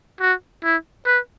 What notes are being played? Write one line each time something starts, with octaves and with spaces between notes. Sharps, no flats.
F#4
E4
B4